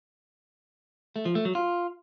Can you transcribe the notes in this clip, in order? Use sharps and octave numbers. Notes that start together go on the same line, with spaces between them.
A3
F3
A3
F#3
F4